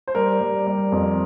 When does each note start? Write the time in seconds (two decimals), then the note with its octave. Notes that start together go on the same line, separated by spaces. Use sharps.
0.08 C5
0.15 G3 A#4
0.41 G3
0.67 G3
0.92 F2